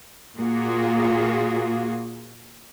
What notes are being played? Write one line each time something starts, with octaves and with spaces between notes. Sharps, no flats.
A#2 A#3 F4 F#4 G#4